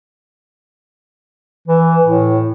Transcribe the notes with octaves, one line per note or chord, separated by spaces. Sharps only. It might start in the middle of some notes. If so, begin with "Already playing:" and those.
E3
A2